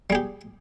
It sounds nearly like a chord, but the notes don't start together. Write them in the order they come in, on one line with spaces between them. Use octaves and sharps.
G3 G#4 G4